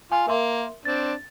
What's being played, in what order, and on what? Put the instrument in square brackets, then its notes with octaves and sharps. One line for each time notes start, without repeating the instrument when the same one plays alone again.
[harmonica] F4 [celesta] G#5
[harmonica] A#3 [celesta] A#4 E5 C6
[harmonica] C4 D4 [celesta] A6